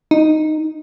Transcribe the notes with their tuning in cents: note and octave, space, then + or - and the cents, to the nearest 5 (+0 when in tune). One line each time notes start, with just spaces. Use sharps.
D#4 -5